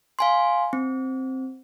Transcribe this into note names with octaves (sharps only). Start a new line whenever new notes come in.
F5 G#5 C6
C4